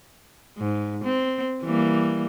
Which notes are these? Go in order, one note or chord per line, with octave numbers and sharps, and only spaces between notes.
G#2
C4
E3 G3 A#3